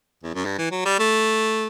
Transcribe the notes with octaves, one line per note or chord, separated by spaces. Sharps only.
E2
F#2
G2
E3
F#3
G3
A3